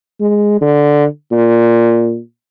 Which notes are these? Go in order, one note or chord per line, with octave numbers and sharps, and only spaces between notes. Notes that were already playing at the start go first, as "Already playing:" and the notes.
G#3
D3
A#2